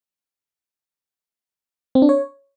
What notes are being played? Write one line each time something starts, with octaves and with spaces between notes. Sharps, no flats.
C4
D4
C#5